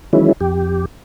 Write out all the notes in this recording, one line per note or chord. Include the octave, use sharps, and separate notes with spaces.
D#3 E3 F#3 G#3 C#4 E4
F2 G4